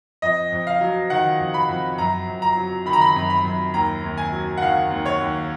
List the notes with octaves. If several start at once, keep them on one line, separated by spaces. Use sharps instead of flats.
F2 D#5
F2
F5
F#3
D#3 F#5
F2
B5
F2
F#2 A#5
F#2
A#5
F#3
D#3 B5
A#5
B5
F#2
B5
F#2
D#2 A#5
D#2
G#5
F#3
F#5
D#3 F5
D#2
C#5
D#2